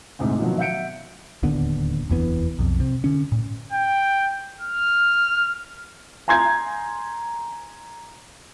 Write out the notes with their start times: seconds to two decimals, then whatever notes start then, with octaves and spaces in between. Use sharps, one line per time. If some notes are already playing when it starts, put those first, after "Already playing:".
0.19 D2 G#2 C3
0.39 B2 D#3 F3 F#3
0.58 E5 F#5 G6 C#7 D7
1.43 D1 D#2 D3 B3
2.09 F1 D#2 E3 B3
2.59 B1 F2
2.80 C3
3.04 D3 C#4
3.32 A2
3.72 G5
4.61 F6
6.28 G#5 A#5 C6 G6 G#6